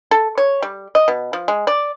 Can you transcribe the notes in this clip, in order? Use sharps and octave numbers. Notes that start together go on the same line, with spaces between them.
A4
C#5
G3
D#5
B2
F3
G#3
D5